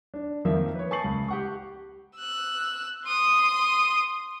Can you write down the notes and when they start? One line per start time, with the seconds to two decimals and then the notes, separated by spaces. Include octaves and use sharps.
0.14 D4
0.45 F2 D#3 F3 A#3 E5
0.76 B4 C#5
0.91 G#5 A5 C#6 A6 C7 F#7
1.04 C#2
1.28 G4 F#5 C#6
2.18 E6 F#6
3.07 C6 D#6